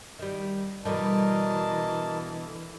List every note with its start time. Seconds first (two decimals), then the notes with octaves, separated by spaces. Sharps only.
0.19 D#3 G3
0.85 B2 D3 E3 G3 A#4 D#5 A5